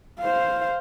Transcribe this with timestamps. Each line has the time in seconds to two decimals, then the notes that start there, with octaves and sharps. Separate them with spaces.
0.20 C5 F5